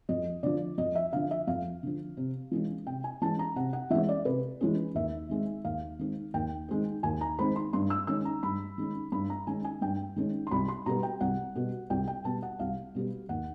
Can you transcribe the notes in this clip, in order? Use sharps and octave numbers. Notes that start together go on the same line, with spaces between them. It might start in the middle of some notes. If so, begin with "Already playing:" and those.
F2 D#5
D3 F3 D5
F2 D#5
E5
D3 F3 F5
E5
F2 F5
D3 F3
C3
E3 G#3 C#4
C3 G5
G#5
E3 G#3 C#4 A5
A#5
C3 F#5
F#5
E3 G#3 C#4 E5
D5
C3 B4
E3 G#3 C#4
D#2 E5
D#3 G#3 C4
D#2 F5
D#3 G#3 C4
D#2 G5
D#3 G#3 C4
D#2 G#5
A#5
D#3 G#3 C4 B5
C6
G2 C6
E6
D#3 G#3 C#4 E6
A#5
G2 B5
D#3 G#3 C#4
G2 B5
A#5
D#3 G#3 C#4 G#5
G#5
G2 G5
D#3 G#3 C#4
C6
C2 B5
C6
B2 G3 B3 A#5
G5
C2 F#5
B2 G3 B3
C2 G5
G5
B2 G3 B3 A5
F#5
C2 F5
B2 G3 B3
D#2 F#5